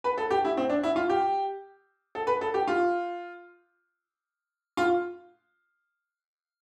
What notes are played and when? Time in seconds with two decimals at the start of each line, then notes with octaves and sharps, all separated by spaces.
0.04 B4
0.18 A4
0.31 G4
0.44 E4
0.57 C4
0.70 D4
0.83 E4
0.96 F4
1.09 G4
2.15 A4
2.27 B4
2.41 A4
2.54 G4
2.67 F4
4.77 F4